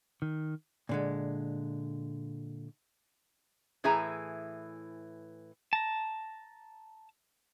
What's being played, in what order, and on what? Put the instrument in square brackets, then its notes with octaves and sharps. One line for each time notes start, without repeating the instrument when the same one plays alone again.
[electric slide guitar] D#3
[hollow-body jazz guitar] A#2 D3 G#3
[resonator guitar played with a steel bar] A2 E3 G#4 E5 G#5 A#5
[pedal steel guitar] A5 A#5